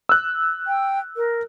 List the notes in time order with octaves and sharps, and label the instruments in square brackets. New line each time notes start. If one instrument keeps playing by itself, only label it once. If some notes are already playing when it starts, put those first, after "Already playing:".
[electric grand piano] E6 F#6
[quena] G5
A#4